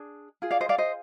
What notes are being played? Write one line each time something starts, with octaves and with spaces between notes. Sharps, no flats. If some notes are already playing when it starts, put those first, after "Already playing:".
Already playing: D4 G#4
F4 G#4
D5 F5
C5 D#5
D5 F5
C5 D#5